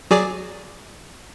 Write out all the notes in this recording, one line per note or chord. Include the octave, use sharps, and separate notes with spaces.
F#3 G#4 D5